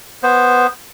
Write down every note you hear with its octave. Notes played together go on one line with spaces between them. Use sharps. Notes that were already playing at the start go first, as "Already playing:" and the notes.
B3 C5